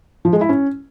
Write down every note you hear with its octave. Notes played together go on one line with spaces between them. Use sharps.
F3
G#3
E4
C#4